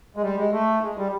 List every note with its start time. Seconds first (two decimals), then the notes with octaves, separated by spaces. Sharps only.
0.17 G#3
0.23 G3
0.37 G#3
0.52 A3
0.83 G#3
0.97 G3